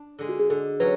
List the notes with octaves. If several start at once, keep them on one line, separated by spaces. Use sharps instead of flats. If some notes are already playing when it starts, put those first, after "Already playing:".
Already playing: D4
D3 G#3
F#4
G#4
D3 A4
F#3 C#4 B4